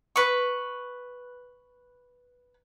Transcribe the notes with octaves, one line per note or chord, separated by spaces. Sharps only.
B4 C#6